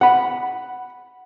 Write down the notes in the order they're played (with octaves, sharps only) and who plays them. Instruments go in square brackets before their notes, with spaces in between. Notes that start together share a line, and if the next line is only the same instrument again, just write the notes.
[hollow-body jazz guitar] F#5 B5